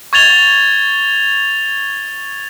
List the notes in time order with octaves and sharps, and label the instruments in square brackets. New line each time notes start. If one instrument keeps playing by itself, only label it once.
[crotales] C#6 G#6 A6 F7 G7